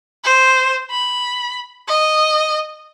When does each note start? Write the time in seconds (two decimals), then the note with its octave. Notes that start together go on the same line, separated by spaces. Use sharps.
0.24 C5
0.91 B5
1.88 D#5